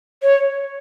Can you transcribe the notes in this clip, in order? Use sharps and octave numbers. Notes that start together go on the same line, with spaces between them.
C#5